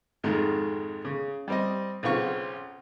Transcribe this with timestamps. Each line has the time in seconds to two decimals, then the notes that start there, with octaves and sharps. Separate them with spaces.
0.23 G#1 F2 D#3 G#3
1.05 C#3
1.48 G3 C4 D#5
2.03 B1 C#3 C4 F4 C#6